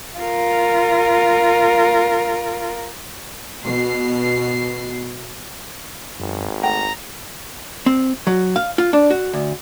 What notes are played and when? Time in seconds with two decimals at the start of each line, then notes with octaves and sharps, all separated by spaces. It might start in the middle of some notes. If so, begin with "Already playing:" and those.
0.18 F4 A#4
3.65 B2 C7
6.20 G#1 F#2
6.63 A3 F#5 G5 A#5
7.86 C4
8.27 F#3
8.56 F5
8.78 F4
8.93 D4
9.10 F#4
9.33 D2